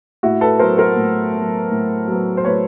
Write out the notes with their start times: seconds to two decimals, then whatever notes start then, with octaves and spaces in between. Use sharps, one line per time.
0.23 A2 E4 F#4
0.41 A4 B4
0.59 F#3 B3 A#4 C5
0.78 A#4 C5
0.96 A2
1.33 F#3 B3
1.71 A2
2.08 F#3 B3
2.37 C5
2.45 A2 B4 C#5